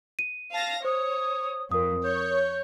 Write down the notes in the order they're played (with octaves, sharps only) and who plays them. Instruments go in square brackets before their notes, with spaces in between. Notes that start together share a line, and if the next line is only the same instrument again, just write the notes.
[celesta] D#7
[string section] F5 A#6 [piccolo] A5
[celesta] C5 [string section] C#5 [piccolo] D#6
[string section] F2 [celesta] A#4 D#6
[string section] C#5 [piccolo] G6